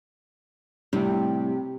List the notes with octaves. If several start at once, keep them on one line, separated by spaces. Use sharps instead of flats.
A2 C3 G3